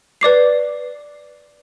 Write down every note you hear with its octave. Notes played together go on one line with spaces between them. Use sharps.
B4 D5 D6 C7